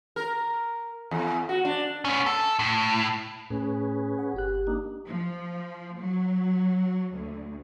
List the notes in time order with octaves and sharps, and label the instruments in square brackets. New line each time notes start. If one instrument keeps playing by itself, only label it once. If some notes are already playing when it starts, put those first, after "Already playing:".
[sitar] A#4
E2
F#4
D4
[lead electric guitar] B3 C#4
A4
A2
[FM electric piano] A2 [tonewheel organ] C#4 G#4 B4
[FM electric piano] F#5
G1 G4 F#6
[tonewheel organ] A#3 D4 D#4
[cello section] F3
F#3
D2